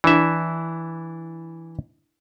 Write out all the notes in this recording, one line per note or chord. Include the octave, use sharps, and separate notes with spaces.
E3 D4 E4 E5